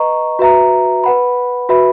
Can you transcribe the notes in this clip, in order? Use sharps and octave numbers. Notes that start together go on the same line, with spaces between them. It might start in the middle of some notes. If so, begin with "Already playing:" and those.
Already playing: B4 D#5 A#5 C#6
F#4 B4 E5 A#5
B4 F#5 B5
F#4 B4 E5 B5